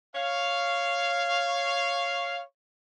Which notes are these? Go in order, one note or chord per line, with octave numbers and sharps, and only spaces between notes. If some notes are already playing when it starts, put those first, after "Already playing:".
C#5 F5